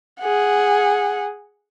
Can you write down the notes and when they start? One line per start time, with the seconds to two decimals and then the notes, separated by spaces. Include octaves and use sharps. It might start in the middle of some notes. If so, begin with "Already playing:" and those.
0.21 G#4 F#5